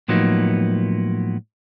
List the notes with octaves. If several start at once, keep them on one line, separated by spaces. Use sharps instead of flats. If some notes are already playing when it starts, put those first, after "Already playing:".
A2 F3 F#3 A#3 B3 D#4